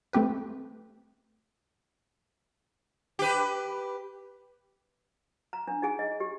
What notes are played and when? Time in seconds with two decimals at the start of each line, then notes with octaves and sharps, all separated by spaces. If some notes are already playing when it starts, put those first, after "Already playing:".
0.13 A3 C4 G4 B4
3.19 G4 B4
5.53 A#5
5.68 D4
5.82 D#4 G#4 G#5
5.99 D#5
6.20 G4